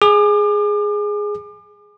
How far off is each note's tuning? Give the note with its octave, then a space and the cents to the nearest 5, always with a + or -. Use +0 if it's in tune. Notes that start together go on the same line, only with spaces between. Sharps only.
G#4 +0 D6 +40